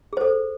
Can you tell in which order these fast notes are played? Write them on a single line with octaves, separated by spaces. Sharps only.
G#4 C5 A4